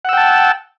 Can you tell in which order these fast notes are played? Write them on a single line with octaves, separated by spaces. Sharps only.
F#5 E6 G5 A5